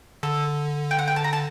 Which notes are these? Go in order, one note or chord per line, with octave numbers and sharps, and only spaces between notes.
D3 A4
G5
F#5
G5
A5
A#5
A5